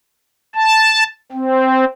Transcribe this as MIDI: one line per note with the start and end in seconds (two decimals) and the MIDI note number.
0.55 1.03 81
1.32 1.84 60